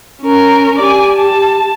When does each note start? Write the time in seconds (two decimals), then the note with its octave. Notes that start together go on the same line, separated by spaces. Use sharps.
0.22 C#4 A#4
0.80 G4 D5 G#5
1.16 A5